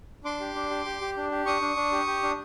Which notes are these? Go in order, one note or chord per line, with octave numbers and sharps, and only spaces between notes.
D4 C6 D6
G4
D4
G4
G4
G4
D4
G4
D4 C#6 D#6
D4
D4
G4
G4
D4